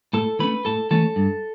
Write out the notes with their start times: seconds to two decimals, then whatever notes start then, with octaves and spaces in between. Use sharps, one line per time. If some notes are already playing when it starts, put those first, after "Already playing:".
0.13 A2 A4 A5
0.39 E3 A3 C#4 B4 B5
0.65 A2 A4 A5
0.91 E3 A3 C#4 A4 A5
1.16 G2